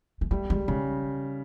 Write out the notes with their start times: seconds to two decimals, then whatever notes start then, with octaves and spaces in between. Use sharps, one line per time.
0.21 G#3
0.31 G3 A3
0.50 G3 G#3
0.68 C#3 G#3